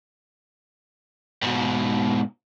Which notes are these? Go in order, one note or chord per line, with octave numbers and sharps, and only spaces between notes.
G#2 B2